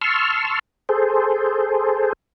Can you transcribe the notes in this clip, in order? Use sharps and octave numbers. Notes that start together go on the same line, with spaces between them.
A5 C6 C#6 E6 F6
G#4 A4 C5